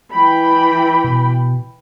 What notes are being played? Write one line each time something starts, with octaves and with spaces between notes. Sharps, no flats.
E3 G5 B5
B2